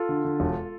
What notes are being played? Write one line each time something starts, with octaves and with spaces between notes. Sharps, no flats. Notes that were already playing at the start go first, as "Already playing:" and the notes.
Already playing: F4 A4
D3
D3
E1